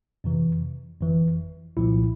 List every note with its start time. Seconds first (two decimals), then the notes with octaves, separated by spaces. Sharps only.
0.24 F2 C3 E3
1.01 G1 F2 E3
1.77 C2 A#2 F3 E4